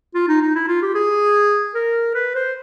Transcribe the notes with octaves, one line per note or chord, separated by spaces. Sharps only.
F4
D#4
D#4
E4
F4
G4
G#4
A#4
B4
C5